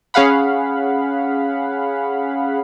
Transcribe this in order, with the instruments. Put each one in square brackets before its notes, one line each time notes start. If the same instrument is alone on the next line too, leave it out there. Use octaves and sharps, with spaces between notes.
[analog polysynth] C#4 G#4 F5 F#5 B5